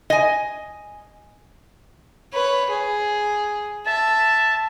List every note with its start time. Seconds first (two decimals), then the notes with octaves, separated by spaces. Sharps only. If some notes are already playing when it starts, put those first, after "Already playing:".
0.10 D#5 G#5
2.33 B4 C#5
2.70 G#4
3.87 E5 A5